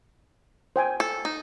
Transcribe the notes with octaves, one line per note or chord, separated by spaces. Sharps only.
C5 G5 G#5
A4
D#4